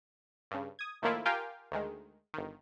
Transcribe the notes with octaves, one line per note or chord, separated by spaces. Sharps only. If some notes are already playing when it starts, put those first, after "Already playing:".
G2 C#3
D#6 G#6
A2 D#3 F3 A#3 E4 F4
F4 G4 A#4 F5 G5 G#5
D2 D#3 G#3
G1 D#3